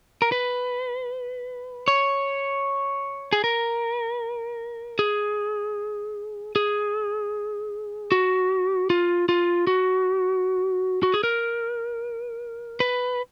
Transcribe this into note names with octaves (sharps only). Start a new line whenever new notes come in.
A#4
B4
C#5
G#4
A#4
G#4
G#4
F#4
F4
F4
F#4
F#4
G#4
A#4
B4